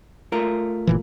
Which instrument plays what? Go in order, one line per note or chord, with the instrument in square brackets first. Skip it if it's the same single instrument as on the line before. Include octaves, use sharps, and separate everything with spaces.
[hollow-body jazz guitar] A3 F4 A#4
[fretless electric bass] G1 A#2 E3